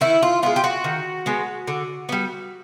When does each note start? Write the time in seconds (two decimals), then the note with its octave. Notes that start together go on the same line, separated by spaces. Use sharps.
0.01 D#3 E4
0.23 F4
0.43 G#3 B3 F4
0.56 G4
0.64 F#4
0.84 D#3
1.26 G#3 B3
1.67 D3
2.09 G3 B3